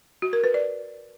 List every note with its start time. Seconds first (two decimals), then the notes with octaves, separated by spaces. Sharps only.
0.22 F#4
0.33 A#4
0.44 B4
0.54 D5